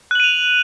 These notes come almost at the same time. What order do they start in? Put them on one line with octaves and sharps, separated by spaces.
F#6 F#7 D#7 F7